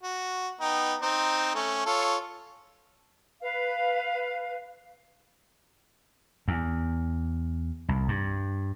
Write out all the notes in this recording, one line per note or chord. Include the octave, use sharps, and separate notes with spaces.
F#4
B3 D#4 G5
C4 D#4
A3 C#4
F4 A4 C#5
B4 F5
E2
C2
G2